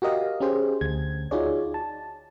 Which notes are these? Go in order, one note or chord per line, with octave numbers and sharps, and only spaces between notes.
F#4 G4 A#4 D#5 F5
C#4 G4 G#4 C5
D2 G#6
D#4 F4 F#4 G#4 C#5 D5
A5